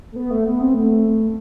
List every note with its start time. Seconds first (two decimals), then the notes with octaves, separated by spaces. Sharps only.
0.12 A3
0.16 B3
0.31 A3
0.46 B3
0.60 C4
0.74 A3